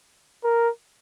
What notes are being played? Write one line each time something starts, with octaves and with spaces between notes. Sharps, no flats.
A#4